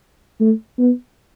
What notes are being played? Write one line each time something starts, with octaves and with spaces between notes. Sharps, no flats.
A3
B3